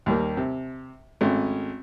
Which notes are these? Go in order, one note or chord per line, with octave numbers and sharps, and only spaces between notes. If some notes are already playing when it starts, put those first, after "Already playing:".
D#2 G3 A#3
C3
G#1 A3 C#4